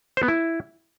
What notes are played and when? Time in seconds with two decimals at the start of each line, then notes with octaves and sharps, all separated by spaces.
0.17 C5
0.23 B3
0.28 E4